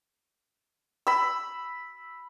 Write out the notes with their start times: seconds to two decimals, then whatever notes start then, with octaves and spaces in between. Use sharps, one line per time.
1.07 B5 E6